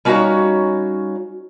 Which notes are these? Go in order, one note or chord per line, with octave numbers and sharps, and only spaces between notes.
G3 C#4 D#4 F#4 C#5 F5